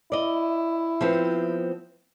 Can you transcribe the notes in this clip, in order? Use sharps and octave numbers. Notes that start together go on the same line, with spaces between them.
E4 D5 D#5
F3 B3 C4